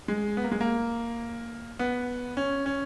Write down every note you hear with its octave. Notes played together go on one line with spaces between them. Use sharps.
G#3
B3
A#3
G#3
A#3
B3
C#4
C#4